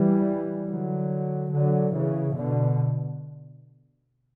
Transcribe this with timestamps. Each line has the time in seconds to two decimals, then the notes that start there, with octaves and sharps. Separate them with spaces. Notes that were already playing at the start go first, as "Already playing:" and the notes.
Already playing: E3 G3
0.68 D3 F#3
1.52 D3 F#3
1.93 C#3 E3
2.35 B2 D3